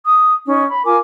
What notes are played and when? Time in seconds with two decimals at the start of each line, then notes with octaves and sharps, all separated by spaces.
0.05 D#6
0.46 C#4 D#4
0.69 B5
0.86 F4 A#4 G#5 D6